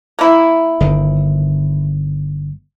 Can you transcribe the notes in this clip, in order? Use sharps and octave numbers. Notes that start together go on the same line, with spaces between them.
A#3 E4
G1 D#3